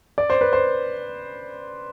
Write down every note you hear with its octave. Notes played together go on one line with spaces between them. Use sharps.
D5
C5
B4
C5